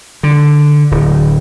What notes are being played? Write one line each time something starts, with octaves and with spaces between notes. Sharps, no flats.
D3
D1